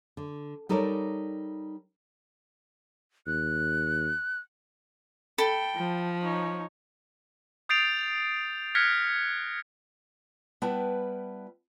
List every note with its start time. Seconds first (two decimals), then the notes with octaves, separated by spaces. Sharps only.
0.17 D3
0.69 G3 D#4 A4 A#4 C#5 D5
3.27 D#2 F#6
5.38 A4 G5 B5
5.76 F3
6.22 D#4 C#5
7.69 D#6 G6 A6 C7 D7 F7
8.75 F6 F#6 G#6 A#6 B6 C#7
10.62 G3 B3 E4 B4 G5 A5